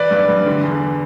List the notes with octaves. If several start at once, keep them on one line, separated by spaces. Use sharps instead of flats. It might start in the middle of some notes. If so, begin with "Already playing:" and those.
Already playing: E3 B4 D5
G2
G2
D3
E2